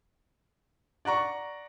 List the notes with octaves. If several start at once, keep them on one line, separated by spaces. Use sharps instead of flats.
D5 F#5 A#5 C#6